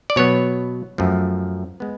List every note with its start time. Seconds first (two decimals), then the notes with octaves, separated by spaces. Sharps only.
0.10 D5
0.16 B2 F#3 B3 C#5
0.98 F#2 F3 A3
1.80 G#3 B3